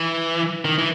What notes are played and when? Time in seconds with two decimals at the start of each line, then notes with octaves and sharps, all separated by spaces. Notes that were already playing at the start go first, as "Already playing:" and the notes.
Already playing: E3
0.65 D#3
0.78 E3